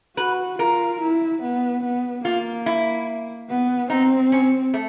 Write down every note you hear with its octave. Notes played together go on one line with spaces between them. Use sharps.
F#4 B4
F4 A#4
E4
B3
B3
A#3 F4
E4
B3
C4 D#4
C#4
A3